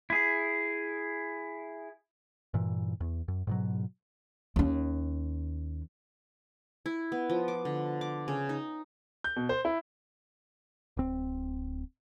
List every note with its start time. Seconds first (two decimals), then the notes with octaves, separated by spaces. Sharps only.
0.10 E4 G#4
2.54 G2 A#2 E3
3.00 E2
3.28 F#2
3.47 G#2 B2 F#3
4.56 D#2 C#4
6.86 E4
7.12 B3
7.30 F3
7.48 D6
7.65 D3
8.01 D6
8.28 C#3
8.49 D#4
9.24 G6
9.36 B2
9.49 C5
9.65 E4
10.97 D1 C4